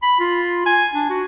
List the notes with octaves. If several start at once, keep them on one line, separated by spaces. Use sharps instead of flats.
B5
F4
G#5
D4
F#4